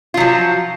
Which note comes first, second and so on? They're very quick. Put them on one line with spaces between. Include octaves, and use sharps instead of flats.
F4 F#3 F3